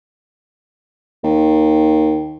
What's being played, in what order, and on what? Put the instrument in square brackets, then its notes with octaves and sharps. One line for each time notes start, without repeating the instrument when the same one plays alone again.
[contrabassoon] D#2